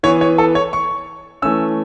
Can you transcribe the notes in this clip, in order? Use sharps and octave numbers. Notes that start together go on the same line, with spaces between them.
E3 B3 C#5
C#5
A4
C#5
C#6
E3 A3 C#4 E6